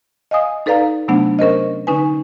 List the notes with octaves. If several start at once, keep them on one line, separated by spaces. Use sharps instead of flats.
D#5 F5 G#5 D#6
D#4 A4 B4 D5 F5 A#5
C3 F#3 A3 B3 D4 F#5
C#4 A#4 C5 D#5
D3 C#4 D#4 B4 G#5